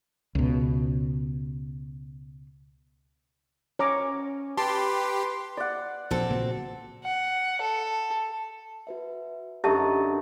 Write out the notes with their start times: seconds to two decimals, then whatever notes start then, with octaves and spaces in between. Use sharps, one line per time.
0.35 C#2 B2
3.79 C#4 C#5 A#5 D6
4.57 G4 B4 A5 C6
5.57 D5 F#5
6.11 A#1 C4 F#4 A4
6.29 A#2 C#3 E3
7.04 F#5
7.62 A4
8.87 F#4 B4 E5
9.64 F#2 D3 D#4 G4 E5 A5 C#6 A6